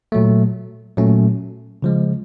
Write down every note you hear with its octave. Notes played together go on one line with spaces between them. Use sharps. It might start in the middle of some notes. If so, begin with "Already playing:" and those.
A#2 F#3 A3
A#2 F#3 A3 C#4
C#3 F3 G#3